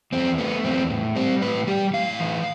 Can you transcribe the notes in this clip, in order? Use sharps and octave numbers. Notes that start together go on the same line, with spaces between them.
E2 C4
A3 B3
E2 C4
A2
G3 C4
A2 B4
G3 G4
A2 F5
E3